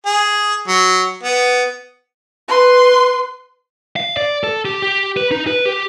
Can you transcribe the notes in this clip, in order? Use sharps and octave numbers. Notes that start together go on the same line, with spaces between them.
G#4
F#3
B3
B4 C6
F5
D5
A4
G4
G4
B4
D#4
B4
G4